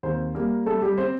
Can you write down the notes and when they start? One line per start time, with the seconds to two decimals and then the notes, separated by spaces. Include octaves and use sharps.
0.03 D#2 C4 C5
0.35 G3 A#3 A#4
0.66 G3 A3 A4
0.82 G3 G4
0.98 C4 C5